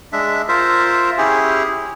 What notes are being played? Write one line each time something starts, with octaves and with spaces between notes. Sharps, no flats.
G#3 D4 E5
F4 A#4 C5 E5
C#4 E4 G4 G#4